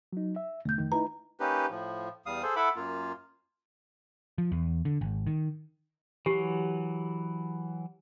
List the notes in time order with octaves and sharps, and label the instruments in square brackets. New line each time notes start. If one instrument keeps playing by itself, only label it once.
[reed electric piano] F#3 D#4
E5
[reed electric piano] D#2 B2 D3 [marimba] A3 G6
[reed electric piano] F2 D#3
[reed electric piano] D#4 E4 B4 [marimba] A#5
[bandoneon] A#3 C#4 D#4 G4 B4
A2 F3
E2 G3 F5 D#6
G#4 A4 C5
E4 A4 E5 F#5 B5 D6
F#2 A#3 F4
[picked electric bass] F3
E2
D3
G#1
D#3
[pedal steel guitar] E3 F#3 [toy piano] G4